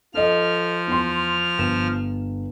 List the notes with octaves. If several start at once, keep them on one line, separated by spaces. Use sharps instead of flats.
F3 A4 D#5 F6
E2 C6
G1 E7